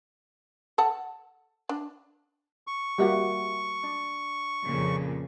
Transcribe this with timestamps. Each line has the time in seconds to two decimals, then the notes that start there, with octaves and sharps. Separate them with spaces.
0.78 A4 F#5 A5
1.69 D4
2.67 C#6
2.98 G3 A#3 F#4 G4 E5 F#5
3.83 D4
4.65 F2 A#2 C#3